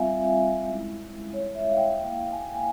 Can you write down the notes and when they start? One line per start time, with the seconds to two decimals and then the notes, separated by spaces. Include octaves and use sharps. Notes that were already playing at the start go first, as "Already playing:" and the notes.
Already playing: G3 C4 F4 E5 F5 G#5
0.68 G#3 C#4 E4
1.33 C#5
1.55 E5
1.71 F5
1.77 G5
1.90 G5
1.99 A#3 E4 F5
2.32 G#5
2.55 G#5